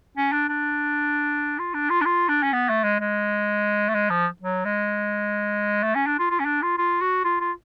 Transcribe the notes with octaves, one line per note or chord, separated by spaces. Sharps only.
C#4
D4
D4
F4
D4
F4
D4
F4
D4
C#4
B3
A3
G#3
G#3
A3
G#3
F3
F#3
G#3
A3
C#4
D4
F4
F4
C#4
D4
F4
F4
F#4
F4
F4